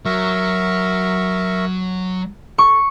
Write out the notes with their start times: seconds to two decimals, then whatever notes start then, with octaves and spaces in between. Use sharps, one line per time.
0.05 F#3 A#4 E5 C#6
2.58 A4 C#6